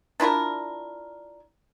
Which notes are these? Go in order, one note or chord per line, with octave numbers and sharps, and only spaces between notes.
D4 E4 F4 A#4